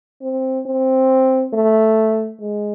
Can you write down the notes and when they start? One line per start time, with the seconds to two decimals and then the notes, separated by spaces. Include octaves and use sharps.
0.22 C4
0.66 C4
1.54 A3
2.41 G#3